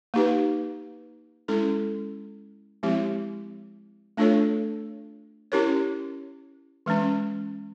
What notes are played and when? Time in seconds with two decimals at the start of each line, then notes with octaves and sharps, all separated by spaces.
0.14 A#3 D#4 G4 B4
1.48 G#3 C#4 E4 A4
2.83 F3 G#3 C4 E4 G4
4.17 A3 D4 F4 A4 C#5
5.52 C#4 E4 G4 A#4 C#5
6.86 E3 G#3 C#4